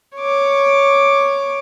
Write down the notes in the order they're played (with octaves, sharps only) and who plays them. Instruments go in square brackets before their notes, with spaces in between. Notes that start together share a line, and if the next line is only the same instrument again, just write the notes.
[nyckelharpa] C#5 D6